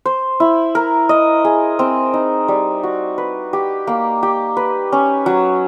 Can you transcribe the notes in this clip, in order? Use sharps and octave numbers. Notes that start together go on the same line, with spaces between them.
C5
E4
A#4
D#5
G#4
C4
D#4
G3
F#4
B4
G4
A#3
G4
B4
C#4
F#3